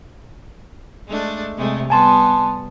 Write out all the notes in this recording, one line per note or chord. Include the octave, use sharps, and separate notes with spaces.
G#3 A3 D4
C3 G#3 A3
G3 B3 G#5 A5 C6